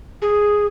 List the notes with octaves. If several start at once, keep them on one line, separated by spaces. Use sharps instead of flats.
G#4